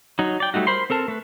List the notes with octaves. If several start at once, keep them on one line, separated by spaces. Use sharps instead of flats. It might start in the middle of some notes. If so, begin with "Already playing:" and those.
F#3 D#4
D5 G5
F#3 G3 A3 D#4 F#4
A#4 C5 B5 C6
C4 A4 A#4 A5
A3 B4